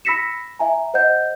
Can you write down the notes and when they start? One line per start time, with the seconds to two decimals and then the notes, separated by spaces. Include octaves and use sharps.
0.05 B5 E6 A#6 B6 C#7 E7
0.59 E5 G#5 A#5
0.94 C5 D#5 F#5 G6